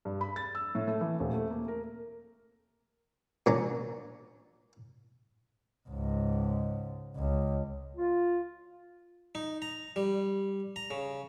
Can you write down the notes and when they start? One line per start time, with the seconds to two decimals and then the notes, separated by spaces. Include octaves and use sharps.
0.05 G2
0.21 B5
0.36 A6
0.55 E6
0.75 A2
0.87 A3
1.01 E3
1.20 D#1
1.34 A3
1.51 A#3
1.68 A#4
3.46 A#2 C#4 D4 A#5
5.89 C#2 G#2
7.16 C#2
7.97 F4
9.35 D#4
9.62 A#5
9.96 G3
10.76 A#5
10.91 C#3